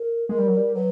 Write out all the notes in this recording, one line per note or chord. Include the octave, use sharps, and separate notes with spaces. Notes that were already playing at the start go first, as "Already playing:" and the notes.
Already playing: A#4
G#3 A#4
G3
F#3
G3
F#3 B4